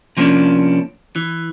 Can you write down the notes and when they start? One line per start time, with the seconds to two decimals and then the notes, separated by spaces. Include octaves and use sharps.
0.17 C3 F3 A#3 B3 C#4 D4
1.16 E3